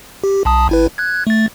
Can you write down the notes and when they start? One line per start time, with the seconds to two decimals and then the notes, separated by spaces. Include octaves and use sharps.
0.24 G4
0.45 B1 A5 D#6
0.69 G#1 E4 B4
0.98 F#6 G#6
1.27 A3 A6